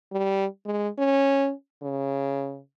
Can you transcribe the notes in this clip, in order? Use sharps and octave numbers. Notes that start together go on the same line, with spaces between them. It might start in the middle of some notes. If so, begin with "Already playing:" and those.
G3
G#3
C#4
C#3